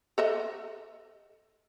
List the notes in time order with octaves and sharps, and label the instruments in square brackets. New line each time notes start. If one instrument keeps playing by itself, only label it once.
[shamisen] A4 D#5 E5